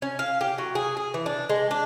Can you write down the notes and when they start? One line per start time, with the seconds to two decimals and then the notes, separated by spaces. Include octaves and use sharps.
0.02 C#4
0.19 F5
0.41 G4
0.58 F#3
0.75 G#4
0.97 G#4
1.14 E3
1.26 D4
1.49 G#3
1.71 D4